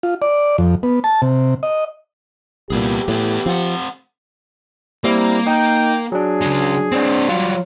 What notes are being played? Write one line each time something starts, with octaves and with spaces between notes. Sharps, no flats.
F4
D5
F2
B3
A5
C3
D#5
C2 A#2 B3 G4 G#4
A2 B3 G#4
F3 C4 F#5
G3 A#3 C4 E4
D#4 G5
F#3 D4 G#4
C#3 G#3
C4 D4
F#3 G3 F4